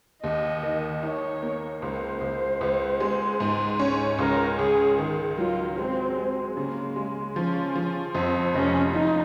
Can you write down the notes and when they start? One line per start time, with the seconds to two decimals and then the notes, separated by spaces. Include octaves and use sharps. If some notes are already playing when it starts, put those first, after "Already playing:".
0.23 D#2 D#5
0.63 D#3
1.03 D#4 C#5
1.42 A#3
1.82 C#2 C5
2.21 C#2
2.61 C#2
3.00 G#3
3.40 G#2
3.79 C#4
4.19 C#2 A#4
4.58 C#2 G#4
4.98 D#3
5.38 F#3 F4
5.78 G#3 C4
6.17 G#3
6.57 C#3 A#3
6.96 G#3
7.36 F3 C#4
7.75 F3
8.15 F2 C4
8.54 F1 C#4
8.94 F3 D#4